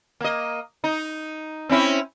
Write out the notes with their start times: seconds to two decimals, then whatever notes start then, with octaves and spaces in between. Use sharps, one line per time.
0.20 A#3 D#5
0.84 D#4
1.69 C4 C#4 E4